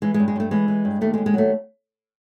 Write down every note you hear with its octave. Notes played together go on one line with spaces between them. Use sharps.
E3 G#3
G#3
G2
G#3
G2 A3
E3 G#3
E3
G2
D#2 A3
G#3
D#2
G#3
F#3 A3